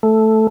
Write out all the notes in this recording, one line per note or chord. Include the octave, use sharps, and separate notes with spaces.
A3